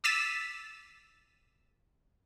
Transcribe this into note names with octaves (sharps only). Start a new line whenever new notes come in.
D6 E6 A6 B6 D#7 E7